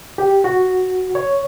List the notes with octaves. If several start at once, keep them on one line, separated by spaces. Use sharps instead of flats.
G4
F#4
C#5